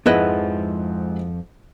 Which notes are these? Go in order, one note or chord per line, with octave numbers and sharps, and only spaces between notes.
F2 G#2 F3 G#3 E4 B4 D#5 F#5